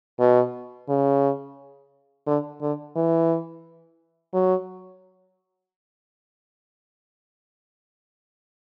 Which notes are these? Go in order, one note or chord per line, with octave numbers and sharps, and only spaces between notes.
B2
C#3
D3
D3
E3
F#3